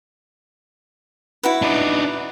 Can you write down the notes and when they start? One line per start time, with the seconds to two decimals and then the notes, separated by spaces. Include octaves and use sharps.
1.43 E4 F#4 B4
1.62 D4 D#4